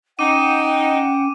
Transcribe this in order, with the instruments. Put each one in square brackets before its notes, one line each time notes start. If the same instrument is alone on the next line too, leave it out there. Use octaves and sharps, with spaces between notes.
[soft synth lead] C#4 [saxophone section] D#4 [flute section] F#5 G5 [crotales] D6 D#7